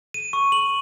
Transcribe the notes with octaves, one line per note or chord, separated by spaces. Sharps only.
D#7
C#6
F#7